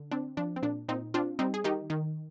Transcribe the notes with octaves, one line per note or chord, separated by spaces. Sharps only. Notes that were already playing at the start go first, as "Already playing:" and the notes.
Already playing: D3
C4 D4
F3 D4
C4
A#2 D4
A#2 C4 D#4
C4 D4 F4
G3 C4 D#4
G#4
D#3 D#4 G4
D#3